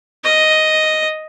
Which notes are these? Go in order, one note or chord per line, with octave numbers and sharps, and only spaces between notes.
D#5